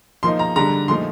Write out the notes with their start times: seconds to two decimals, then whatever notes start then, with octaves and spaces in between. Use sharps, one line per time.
0.23 F3 A#3 D#4 C6
0.39 A#5
0.56 D3 G3 D4 A#5
0.88 A#2 F3 A3 D#4 C6